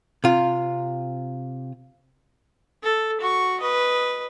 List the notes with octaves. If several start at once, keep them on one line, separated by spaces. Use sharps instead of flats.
C3 F4
A4
F#4 C#6
B4 D#5